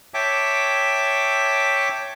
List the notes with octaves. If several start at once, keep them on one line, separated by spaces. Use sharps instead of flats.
C#5 E5 G5 A5 D6